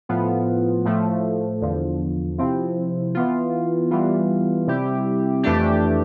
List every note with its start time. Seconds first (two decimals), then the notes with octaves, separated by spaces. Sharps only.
0.09 A2 F3 B3 F4
0.85 A2 F3 A3
1.62 E2 D3 F3
2.38 C3 F3 C4 E4
3.14 E3 B3 F4
3.91 E3 G3 B3 F4
4.67 C3 G3 C4 E4 G4
5.43 F2 E3 A3 D4 G4